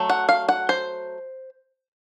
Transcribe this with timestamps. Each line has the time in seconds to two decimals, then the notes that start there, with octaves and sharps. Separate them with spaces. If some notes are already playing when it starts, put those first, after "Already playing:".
Already playing: F#3 A3
0.10 F#5
0.29 F5
0.49 F#5
0.69 C5